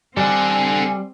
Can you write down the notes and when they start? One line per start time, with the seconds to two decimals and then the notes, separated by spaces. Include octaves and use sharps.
0.17 G3 C4 A4 F#5 G#5